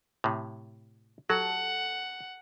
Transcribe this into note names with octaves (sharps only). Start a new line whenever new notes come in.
A2 C3
F#3 A4 F#5